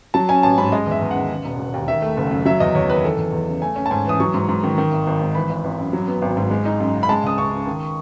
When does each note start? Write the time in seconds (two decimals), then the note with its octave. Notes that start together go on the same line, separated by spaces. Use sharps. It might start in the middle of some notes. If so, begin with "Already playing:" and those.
0.14 F#3 A5
0.29 C#4 G#5
0.43 A1 A5
0.58 G#2 B5
0.72 G#3 D#5
0.86 E2
0.91 E5
1.02 E2
1.11 D#3 F#5
1.30 C#3
1.44 E1
1.59 E1
1.74 D#2
1.88 D#3 E5
2.02 A3
2.17 F#1
2.31 F#2
2.45 F#3 E5
2.60 E2 D#5
2.75 E2 C#5
2.90 D#3 B4
3.04 E3 A4
3.18 E2
3.32 E2
3.47 C#3
3.61 A3 G#5
3.76 C#4
3.86 A5
3.91 G#2 G#5
4.06 E3 D#6
4.20 F#3 C#6
4.34 G#2
4.49 G#2
4.64 D#3
4.78 D#3
4.92 G#1
5.07 G#1
5.21 G#2
5.35 E3 B5
5.49 G#1
5.64 G#1
5.79 F#2
5.93 F#3
6.08 B3
6.22 G#1
6.37 G#2
6.51 G#3
6.65 D#4
6.80 F#2
6.95 C#3
7.03 B5
7.09 G#3 A5
7.23 C#2 D#6
7.38 C#2 C#6
7.53 C#3
7.67 D#3